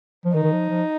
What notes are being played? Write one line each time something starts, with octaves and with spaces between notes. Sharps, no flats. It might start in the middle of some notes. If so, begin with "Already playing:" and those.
F3
D#3 D#4
D#3
F3
F3